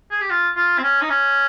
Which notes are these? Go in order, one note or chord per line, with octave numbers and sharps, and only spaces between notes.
G#4
G4
F4
F4
C4
C#4
D#4
C#4